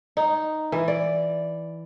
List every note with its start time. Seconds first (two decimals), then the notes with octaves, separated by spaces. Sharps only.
0.17 D#4
0.72 E3
0.88 D5